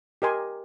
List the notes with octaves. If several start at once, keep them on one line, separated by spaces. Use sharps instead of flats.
G4 A#4 D#5 G#5 C6